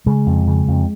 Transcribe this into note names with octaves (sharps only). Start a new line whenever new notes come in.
C#3 G#3
F2
C#3
F2